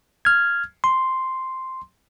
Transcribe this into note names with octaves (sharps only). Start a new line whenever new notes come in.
F6 G#6
C6